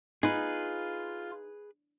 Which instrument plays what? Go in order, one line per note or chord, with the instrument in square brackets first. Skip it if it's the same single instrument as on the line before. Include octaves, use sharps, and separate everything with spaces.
[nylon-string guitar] D#4 [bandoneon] F4 [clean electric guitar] G#4 B4